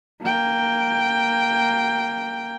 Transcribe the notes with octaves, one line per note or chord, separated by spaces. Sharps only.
A#3 G5